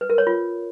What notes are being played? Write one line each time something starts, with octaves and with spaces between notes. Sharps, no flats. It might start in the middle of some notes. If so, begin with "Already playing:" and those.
B4
A#4
C#5
F4